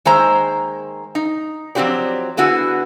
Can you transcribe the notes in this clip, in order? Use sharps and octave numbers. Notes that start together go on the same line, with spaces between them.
D#3 G#3 A#3 C5 E5 A#5
D#4
F3 F#3 C4 F#4 G4 D5
D3 B3 E4 F#4 G#4